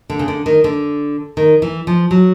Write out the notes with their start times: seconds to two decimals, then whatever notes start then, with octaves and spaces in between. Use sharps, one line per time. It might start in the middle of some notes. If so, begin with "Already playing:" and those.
0.10 D3
0.19 C#3
0.28 D3
0.46 D#3
0.64 D3
1.37 D#3
1.62 E3
1.87 F3
2.11 F#3